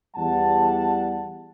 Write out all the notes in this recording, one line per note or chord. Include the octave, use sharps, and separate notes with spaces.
E2 G3 F#5 A5